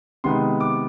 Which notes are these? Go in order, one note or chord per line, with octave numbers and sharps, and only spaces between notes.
C3 D#3 G#3 B3 D#4 C6
D6